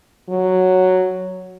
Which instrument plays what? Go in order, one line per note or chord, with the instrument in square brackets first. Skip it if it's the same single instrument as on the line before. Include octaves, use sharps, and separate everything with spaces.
[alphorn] F#3